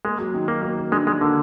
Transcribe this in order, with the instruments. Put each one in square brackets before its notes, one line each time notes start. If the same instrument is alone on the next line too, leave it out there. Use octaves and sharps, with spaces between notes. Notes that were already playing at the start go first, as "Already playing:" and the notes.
[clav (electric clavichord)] G#3 [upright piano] A#3
[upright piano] F#3
D#3
[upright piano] F#3 [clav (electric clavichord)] A#3
[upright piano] A#3
A#3
[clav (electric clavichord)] G#3 [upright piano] D4
[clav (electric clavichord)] G#3 [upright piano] D4
[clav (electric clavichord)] D3 [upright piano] A#3